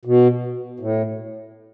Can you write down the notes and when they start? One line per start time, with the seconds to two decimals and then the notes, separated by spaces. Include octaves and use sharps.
0.05 B2
0.80 A2